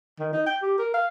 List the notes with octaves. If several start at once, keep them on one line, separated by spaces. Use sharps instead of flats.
D#3
D#4
G5
G4
A#4
F5